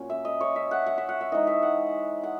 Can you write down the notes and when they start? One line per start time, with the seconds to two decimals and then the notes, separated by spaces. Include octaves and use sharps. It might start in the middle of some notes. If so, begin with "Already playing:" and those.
Already playing: A#2 F#3 C#4
0.10 E5
0.25 D#5
0.41 C#5
0.56 E5
0.71 F#5
0.86 F#5
0.98 E5
1.09 F#5
1.21 E5
1.32 E3 G#3 D#4 D#5
1.47 E5
1.62 F#5
2.23 F#5